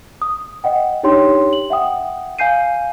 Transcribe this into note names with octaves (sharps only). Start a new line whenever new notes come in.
D#6
D#5 F#5 G5
D4 D#4 G4 C#5 G5 C6
F#7
E5 F#5 G5 D#6
F5 G#5 G6 C7 D#7